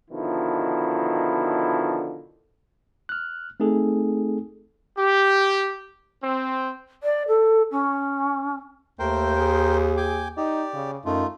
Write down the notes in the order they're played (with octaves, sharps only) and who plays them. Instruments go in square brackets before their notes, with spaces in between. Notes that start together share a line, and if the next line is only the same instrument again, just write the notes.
[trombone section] B2 D3 D#3 F3 E4
[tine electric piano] F6 F#6
A3 C4 D#4 G#4 A4
[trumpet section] G4
C4
[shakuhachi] D5
A4
C#4
[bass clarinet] D#2 [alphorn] A3 [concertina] A#4 C5 G5
[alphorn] G#4
[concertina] G5 G#5 D6
[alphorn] D#4 [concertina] G4 D5
[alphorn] C#3
[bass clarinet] F#2 [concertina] A3 F4 [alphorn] D#4